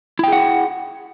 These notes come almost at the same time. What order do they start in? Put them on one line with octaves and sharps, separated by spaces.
E4 G5 G#4 F#5